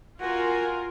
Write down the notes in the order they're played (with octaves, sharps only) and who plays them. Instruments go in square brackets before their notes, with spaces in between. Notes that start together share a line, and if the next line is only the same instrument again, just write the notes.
[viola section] F4 A#4 [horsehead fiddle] F#4 G#5